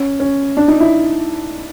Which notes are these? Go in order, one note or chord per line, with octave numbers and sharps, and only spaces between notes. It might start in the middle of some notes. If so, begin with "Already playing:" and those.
Already playing: C#4
C#4
D4
D#4
E4